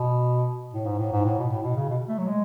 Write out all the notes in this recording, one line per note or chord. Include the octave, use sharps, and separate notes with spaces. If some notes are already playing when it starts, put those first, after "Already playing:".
Already playing: B2
A2
G#2
A2
G#2
A2
B2
A2
B2
C#3
B2
A3
F#3
G#3